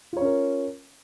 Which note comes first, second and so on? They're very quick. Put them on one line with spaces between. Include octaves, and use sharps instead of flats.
F4 C#5 C#4 A#4